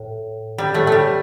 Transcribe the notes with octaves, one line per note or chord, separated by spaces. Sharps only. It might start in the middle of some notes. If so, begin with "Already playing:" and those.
Already playing: A2
G3
A2 A3
G3 A3